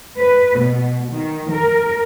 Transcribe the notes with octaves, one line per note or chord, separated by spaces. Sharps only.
B4
B2
D#3
A#4